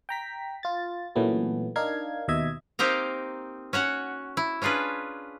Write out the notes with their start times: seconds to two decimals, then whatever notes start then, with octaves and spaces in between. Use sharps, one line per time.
0.09 G5 A#5 B6
0.63 F4 A6
1.15 A#2 E3 F#3 A3 B3 C#4
1.76 D4 D#4 A#4 F5 G#6
2.28 D#2 B2 D#5 E5 G#6
2.79 A#3 C4 D#4 G4 A#4
3.73 C#4 F#4 C#5 F#5
4.37 E4
4.62 C#4 D4 F4 G#4 B4